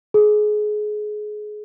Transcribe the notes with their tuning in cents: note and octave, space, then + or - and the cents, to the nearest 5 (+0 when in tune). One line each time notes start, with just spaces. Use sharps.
G#4 +25